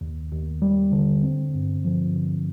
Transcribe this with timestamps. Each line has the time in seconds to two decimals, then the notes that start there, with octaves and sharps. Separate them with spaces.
0.01 D#2
0.32 D#2
0.62 G3
0.92 D3
1.23 C4
1.54 G2
1.85 F3
2.16 D3